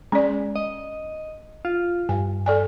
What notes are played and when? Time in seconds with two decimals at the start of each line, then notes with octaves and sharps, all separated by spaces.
0.12 G#3 C#4 D5
0.56 D#5
1.65 F4
2.09 G2 G#5
2.46 A4 D5 G#5